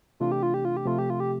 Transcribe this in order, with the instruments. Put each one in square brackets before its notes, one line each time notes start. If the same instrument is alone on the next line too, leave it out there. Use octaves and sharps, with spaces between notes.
[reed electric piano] C3 E3 A3 D4 [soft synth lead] F4
[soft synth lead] G4
F4
G4
F4
G4
[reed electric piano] C3 F3 A3 [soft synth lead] F4
[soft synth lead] G4
F4
G4